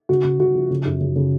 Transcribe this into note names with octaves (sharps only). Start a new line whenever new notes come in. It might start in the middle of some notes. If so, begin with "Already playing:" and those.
C#3 F#4
C#3
C#3 F#4
F3
C#3
F#2
C#3
C#3